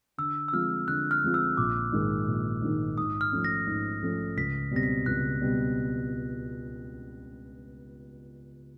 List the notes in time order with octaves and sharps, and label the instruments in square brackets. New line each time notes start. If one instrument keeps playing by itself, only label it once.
[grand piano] D3 [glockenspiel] E6
[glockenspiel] E6
[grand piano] F3 G#3 C4 F4 [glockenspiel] F6
[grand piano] D3 [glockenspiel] F#6
[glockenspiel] F6
[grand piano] F3 G#3 C4 F4
[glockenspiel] E6
[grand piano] A#1 [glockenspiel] D6
[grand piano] G#2 D#3 G#3
A#1
G#2 D#3 G#3
[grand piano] G#2 [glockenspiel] D#6
[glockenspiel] F6
[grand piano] F3 A3 C#4
[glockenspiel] A#6
[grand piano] G#2
F3 A3 C#4
[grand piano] C#2 [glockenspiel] B6
[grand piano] B2 G3 C4 [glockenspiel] A#6
[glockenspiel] B6
[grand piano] C#2 [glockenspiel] F#6
[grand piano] B2 G3 C4